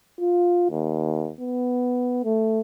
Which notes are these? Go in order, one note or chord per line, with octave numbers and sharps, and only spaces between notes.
F4
D#2
B3
A3